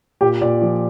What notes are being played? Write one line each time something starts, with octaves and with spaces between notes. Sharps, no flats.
A#2 G4
A#2 D5
F3